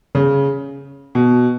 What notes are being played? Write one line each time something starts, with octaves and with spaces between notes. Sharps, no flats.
C#3
B2